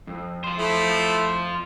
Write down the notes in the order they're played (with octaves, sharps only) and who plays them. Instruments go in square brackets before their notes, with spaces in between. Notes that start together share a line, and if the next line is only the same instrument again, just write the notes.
[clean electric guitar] F2
[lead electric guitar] F4 C5
[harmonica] A3 E4